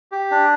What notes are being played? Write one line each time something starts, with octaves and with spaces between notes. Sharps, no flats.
G4
D4